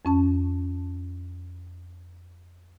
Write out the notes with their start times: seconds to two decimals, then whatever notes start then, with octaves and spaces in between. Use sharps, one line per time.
0.05 F2 C#4 A5